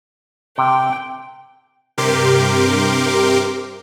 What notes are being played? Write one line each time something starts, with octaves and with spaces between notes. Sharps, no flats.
C3 G5
G2 C3 G4 A#4 C6 D6